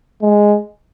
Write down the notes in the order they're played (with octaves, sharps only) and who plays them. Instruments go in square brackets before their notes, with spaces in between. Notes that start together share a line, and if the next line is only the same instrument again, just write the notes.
[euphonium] G#3